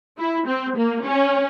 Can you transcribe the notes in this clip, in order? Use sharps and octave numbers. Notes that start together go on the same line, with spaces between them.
E4
C4
A#3
C#4